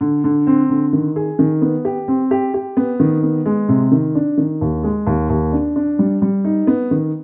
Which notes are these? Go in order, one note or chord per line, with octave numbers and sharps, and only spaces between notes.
D3
D3
C4
D3
D#3
G#4
D#3
B3
G4
C4
G4
G4
B3
D#3
B3
G#3
C3
D#3
D4
D#3
D#2
G#3
D#2
D#2
D4
D4
G3
G3
D#4
B3
D#3